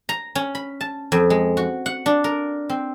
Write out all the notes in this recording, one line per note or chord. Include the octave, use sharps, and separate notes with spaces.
A#5
C#4
B5
A5
F2
G#3
F#4
F#5
D4
A#4
C4